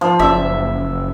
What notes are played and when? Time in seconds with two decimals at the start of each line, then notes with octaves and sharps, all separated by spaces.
0.01 F3
0.19 F#1 E5